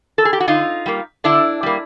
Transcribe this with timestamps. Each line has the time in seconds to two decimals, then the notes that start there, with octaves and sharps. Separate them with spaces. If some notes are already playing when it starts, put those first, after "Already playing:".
0.18 A4
0.25 G#4
0.33 G4
0.40 F#4
0.48 D3 D#4 F4
0.86 G3 A#3
1.24 D3 D4 E4
1.63 G3 A#3